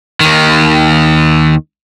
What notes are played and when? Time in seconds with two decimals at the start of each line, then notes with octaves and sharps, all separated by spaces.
0.20 D#2 D#3